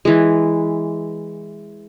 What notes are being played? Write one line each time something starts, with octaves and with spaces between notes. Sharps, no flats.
E3 G#3